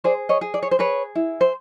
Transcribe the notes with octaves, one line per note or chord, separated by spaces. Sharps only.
G#4 C5 D5
C#5 D#5
G#4
D5
C#5
C5
G#4 B4 C#5
E4
C5